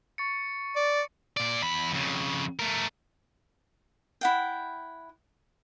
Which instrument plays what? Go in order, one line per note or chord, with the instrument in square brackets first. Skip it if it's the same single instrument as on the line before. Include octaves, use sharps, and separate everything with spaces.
[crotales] C#6 A6 C#7
[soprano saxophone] D5
[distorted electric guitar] A#2 D5
E2 B5
F2 C#3
A3 A#4
[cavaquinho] E4 F#5 G5